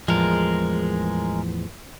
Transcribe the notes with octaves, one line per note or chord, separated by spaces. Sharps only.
E2 A2 F3 G#3 A#4